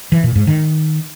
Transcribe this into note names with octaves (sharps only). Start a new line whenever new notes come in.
E3
A#2
G#2
D#3